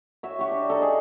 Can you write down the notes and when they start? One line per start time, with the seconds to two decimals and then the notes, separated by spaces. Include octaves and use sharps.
0.23 F#4 C#5 E5
0.39 F#4 G4
0.51 D4
0.69 D#4 A4
0.82 G#4